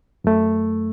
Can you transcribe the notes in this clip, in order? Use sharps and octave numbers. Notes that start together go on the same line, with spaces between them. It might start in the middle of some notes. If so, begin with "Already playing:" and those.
F#2 A3